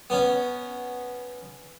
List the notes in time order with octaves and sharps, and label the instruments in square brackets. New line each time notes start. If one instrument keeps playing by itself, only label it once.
[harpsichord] B3 C#4